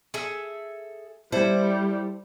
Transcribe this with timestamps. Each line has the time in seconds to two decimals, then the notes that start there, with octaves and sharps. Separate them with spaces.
0.14 G#4 A4 E5
1.32 G3 E4 A4 C5